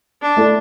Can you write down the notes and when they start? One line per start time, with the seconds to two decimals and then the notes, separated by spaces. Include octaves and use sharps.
0.22 D4
0.37 A3 E4 A4 D5